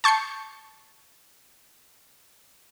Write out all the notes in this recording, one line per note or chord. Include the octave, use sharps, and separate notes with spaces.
A5 C#6 G6 C7 C#7